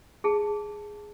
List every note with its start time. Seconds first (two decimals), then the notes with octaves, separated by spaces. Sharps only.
0.24 G#4 A5